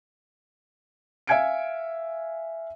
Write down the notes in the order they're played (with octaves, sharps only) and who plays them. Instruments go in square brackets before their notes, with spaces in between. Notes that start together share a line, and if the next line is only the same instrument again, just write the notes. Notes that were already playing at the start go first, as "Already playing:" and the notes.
[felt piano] E5 F5 G#5 G#6 C#7 D7